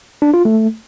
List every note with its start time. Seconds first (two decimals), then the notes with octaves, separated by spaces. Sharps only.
0.22 D4
0.34 F4
0.45 A3